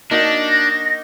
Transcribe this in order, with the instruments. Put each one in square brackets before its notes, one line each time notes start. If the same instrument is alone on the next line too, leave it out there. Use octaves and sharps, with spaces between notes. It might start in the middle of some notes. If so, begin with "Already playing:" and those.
[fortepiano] A#3 D#4 F#4 [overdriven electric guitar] D4 [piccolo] A#6